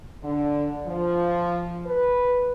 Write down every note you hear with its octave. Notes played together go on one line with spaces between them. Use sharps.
D3
F3
B4